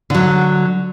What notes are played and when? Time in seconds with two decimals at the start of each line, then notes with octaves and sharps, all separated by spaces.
0.10 D3 F#3